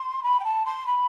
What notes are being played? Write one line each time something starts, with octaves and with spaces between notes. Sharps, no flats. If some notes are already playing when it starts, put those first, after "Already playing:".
Already playing: C6
B5
G5
A5
C6
B5